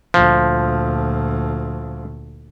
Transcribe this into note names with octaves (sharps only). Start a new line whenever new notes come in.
D2 A#2 F3